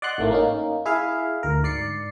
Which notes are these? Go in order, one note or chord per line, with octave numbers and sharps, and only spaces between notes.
D5 D#5 F#5 C6 F#6
G#1 A2 A3 A#3
A#3 C#4 D#4
E4 G#4 E5 F5
D2 A#4
G#2 D5 C7 C#7